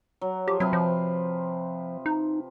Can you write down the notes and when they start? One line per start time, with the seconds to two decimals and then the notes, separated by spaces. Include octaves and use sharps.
0.21 F#3
0.48 F3 G4
0.60 C3 F#3 B4 F5
0.73 F3
2.06 D#4